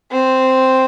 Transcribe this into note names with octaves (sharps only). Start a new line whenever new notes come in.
C4